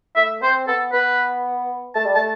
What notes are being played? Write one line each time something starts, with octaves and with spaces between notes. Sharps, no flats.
A3 E5
C4 C5
B3 A4
B3 B4
A3 A5
G3
A3 A5